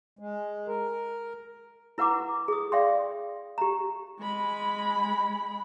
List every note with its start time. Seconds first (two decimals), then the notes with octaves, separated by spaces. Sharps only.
0.19 G#3
0.68 A#4
1.98 E4 B4 F#5 A#5 D6
2.48 G#4 D#6
2.72 D5 F5 G5 C6
3.58 G4 A#5
4.20 G#3 B5